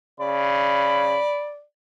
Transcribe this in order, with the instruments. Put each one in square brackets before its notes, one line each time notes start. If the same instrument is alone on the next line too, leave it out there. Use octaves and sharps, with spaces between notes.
[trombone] C#3 [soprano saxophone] D5 [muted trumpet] B5